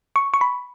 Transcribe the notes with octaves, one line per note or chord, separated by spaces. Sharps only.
C#6
C#6
B5